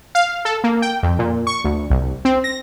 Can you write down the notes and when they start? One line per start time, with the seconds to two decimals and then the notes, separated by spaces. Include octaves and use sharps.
0.15 F5
0.45 A4
0.64 A#3
0.82 G5
1.03 F2
1.19 A#2
1.47 C#6
1.64 D2
1.90 C2
2.25 C4
2.44 A#6